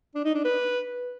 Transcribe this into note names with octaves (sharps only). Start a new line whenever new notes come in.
D4
D#4
D4
B4